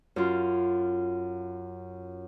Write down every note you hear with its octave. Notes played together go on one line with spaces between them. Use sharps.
F#2 F4